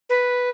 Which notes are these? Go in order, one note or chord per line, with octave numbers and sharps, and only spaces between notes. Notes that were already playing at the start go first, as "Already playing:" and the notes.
B4